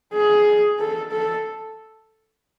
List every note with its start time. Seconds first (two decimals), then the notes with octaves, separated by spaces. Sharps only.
0.14 G#4
0.79 A4
1.11 A4